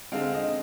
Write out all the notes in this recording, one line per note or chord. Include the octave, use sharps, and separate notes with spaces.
D3 G#3 C4 F5
D#5